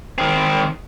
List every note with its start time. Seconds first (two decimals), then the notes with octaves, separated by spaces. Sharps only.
0.18 D#3 C4